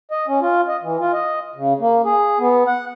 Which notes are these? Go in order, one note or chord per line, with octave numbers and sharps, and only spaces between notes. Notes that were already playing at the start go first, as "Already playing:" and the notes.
D#5
C#4
F4
D#5
E3
F4
D#5
C#3
A#3
G#4
B3
F#5